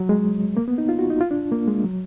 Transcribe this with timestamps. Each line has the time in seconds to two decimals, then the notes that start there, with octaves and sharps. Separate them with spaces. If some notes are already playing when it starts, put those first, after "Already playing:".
Already playing: F#3
0.09 G#3
0.57 A#3
0.68 B3
0.78 D#4
0.89 F4
0.99 F#4
1.10 D#4
1.20 F4
1.31 D4
1.52 A#3
1.68 G#3
1.84 F#3